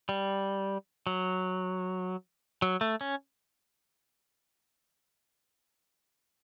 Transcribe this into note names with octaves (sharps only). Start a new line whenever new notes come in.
G3
F#3
F#3
A3
C#4